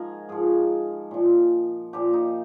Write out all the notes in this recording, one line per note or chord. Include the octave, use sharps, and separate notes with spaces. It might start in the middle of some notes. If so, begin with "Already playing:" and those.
Already playing: G#2 F3 G#4 A#4
G#2 F3 G#4
A#2 F3
A#2 F3 G4
D#4